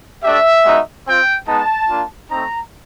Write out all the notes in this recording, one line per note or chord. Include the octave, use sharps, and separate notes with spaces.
A3 D4 G4 E5
G#3 B3 D#4 F#4
C4 F4 G5
G#3 B3 D#4 A5
A#3 D4 F4
A3 C4 D#4 A#5